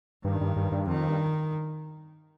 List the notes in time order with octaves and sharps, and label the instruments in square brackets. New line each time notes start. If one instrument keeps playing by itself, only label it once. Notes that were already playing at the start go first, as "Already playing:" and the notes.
[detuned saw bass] G2 [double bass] D#3
[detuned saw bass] G2
G2
G2
[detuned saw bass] F2 [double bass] D#3
[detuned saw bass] G2